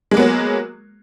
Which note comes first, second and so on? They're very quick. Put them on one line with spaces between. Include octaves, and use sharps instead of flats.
G#3 A#3 B3 F#3